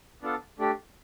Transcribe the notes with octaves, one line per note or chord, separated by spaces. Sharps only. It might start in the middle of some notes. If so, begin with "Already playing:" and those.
B3 D4 F4 A4
A3 D4 G4